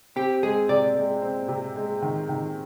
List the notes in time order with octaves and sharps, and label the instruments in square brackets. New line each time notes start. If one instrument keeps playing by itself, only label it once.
[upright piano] C4 [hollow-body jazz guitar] G4
[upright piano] G#3 [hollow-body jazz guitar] G#4
[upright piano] C3 [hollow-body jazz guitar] D5
[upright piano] G#3
C4
C3
G#3
D#3
D#3